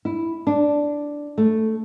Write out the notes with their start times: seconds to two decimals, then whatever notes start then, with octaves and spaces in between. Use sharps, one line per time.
0.05 E4
0.47 D4
1.38 A3